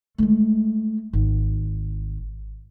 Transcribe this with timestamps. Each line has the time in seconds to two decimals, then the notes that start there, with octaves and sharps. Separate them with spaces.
0.18 G#3 A3
1.13 G#1